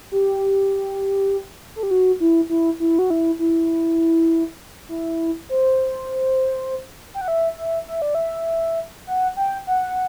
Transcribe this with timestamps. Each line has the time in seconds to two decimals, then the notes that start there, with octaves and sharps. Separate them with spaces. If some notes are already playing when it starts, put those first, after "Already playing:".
0.12 G4
1.76 A4
1.83 G4
1.91 F#4
2.20 E4
2.49 E4
2.80 E4
2.99 F#4
3.10 E4
3.39 E4
4.89 E4
5.49 C5
7.14 G5
7.21 F#5
7.28 E5
7.58 E5
7.88 E5
8.02 D5
8.15 E5
9.07 F#5
9.36 G5
9.67 F#5